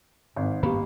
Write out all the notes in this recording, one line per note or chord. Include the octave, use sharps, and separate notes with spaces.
G#1 G#2
G2 A#3 B3 C#4 G4 B5